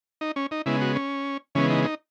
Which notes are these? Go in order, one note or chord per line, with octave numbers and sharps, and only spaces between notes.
D#4
C#4
D#4
C#3 G#3 B3 E4
F#4
C#4
C#3 E3 G#3 B3 C#4
D#4
D#4